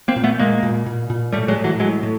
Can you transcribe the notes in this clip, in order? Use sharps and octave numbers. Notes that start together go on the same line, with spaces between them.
A#3 C4
A#2
A3 B3
A#2 G#3 A#3
A#2
A#2
A#2
A2 G3 A3
F#3 G#3
A2
E3 F#3
A2 F#3 G#3
A2